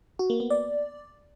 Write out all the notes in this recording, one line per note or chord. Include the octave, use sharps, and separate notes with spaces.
F#4
A#3
B3
D5